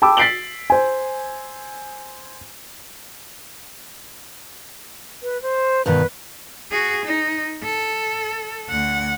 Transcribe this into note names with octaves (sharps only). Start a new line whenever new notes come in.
G5 A5 B5 D6 E6
A6 B6 C7 D7 F#7 G7
C5 G#5
B4
C5
G2 B2 D#3 B4
F#4 G#4
D#4
A4
D2 F#5